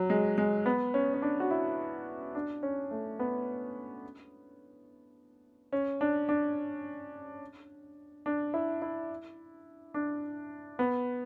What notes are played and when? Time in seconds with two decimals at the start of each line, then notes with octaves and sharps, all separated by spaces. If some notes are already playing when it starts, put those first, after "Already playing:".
Already playing: F#3
0.10 G#3
0.38 G#3
0.66 B3
0.94 C#4
1.14 C#4
1.22 D4
1.40 F#4
1.51 E4
2.35 D4
2.63 C#4
2.91 A3
3.19 B3
5.73 C#4
6.01 D4
6.29 D4
8.26 D4
8.54 E4
8.82 E4
9.94 D4
10.79 B3